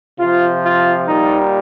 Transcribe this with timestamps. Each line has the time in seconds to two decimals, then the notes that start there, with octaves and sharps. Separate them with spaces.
0.20 C3 F3 F4
0.65 F4
1.08 A#2 G3 D#4